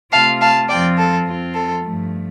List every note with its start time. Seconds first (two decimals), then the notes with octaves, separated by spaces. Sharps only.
0.12 C3 A3 F4 F5 A5
0.41 F5 A5
0.69 F2 F3 C4 F4 D5 G5
0.97 A4
1.26 F2 F3 C4 F4
1.54 A4
1.83 G2 F3 A3